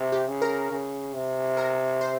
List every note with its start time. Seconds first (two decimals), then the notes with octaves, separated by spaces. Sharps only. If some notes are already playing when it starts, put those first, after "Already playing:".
Already playing: C3
0.12 G4
0.27 C#3
0.42 A#4
0.71 C#3
1.14 C3
1.57 A#4
2.01 C5